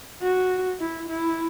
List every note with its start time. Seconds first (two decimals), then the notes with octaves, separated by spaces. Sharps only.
0.22 F#4
0.80 E4
1.08 E4